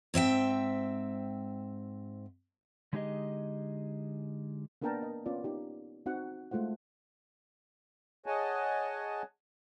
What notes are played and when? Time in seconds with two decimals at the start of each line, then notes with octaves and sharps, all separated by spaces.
0.14 G#2 C4 E5 G5
2.93 D3 G#3 D#4 G4 G#4 D#5
4.82 A#3 B3 D4 A#4 G5 A5
5.03 D#5
5.26 B3 C#4 F4 D5
5.44 D#4 G4
6.06 C4 D#4 F#4 F#5
6.51 G#3 A3 F4 C5 F#5
8.26 G#4 C#5 D#5 F#5 G#5 A5